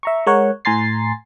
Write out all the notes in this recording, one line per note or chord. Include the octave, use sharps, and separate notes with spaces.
E5 A#5 C#6
G#3 A#4 C#5 F#5
A2 G#5 A#5 C6 A6 C7